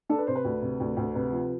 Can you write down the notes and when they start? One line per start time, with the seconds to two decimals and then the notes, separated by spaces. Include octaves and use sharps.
0.09 D4 A4
0.18 B4
0.27 C3 C5
0.36 B4
0.45 D2
0.62 C3
0.80 D2
0.97 D2
1.15 C3 B4
1.33 F3